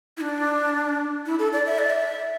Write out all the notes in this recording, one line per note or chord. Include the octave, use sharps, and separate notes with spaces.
E4
D4
E4
A4
D5
E5
D5
E5